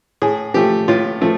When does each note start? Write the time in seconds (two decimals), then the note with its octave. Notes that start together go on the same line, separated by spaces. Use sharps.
0.22 A2 G#4
0.54 F3 A3 G4
0.88 A2 F4
1.21 F3 A3